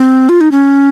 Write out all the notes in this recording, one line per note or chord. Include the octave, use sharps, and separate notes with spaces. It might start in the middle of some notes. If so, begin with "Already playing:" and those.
Already playing: C4
F4
D#4
C#4